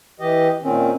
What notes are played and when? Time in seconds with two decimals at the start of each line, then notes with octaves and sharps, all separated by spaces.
0.20 E3 G4 D#5
0.63 A#2 D#3 C4 C#4